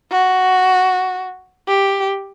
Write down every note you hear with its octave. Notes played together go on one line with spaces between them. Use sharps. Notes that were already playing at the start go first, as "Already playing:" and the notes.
F#4
G4